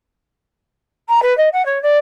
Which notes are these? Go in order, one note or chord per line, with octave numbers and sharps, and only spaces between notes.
A#5
B4
D#5
F#5
C#5
D5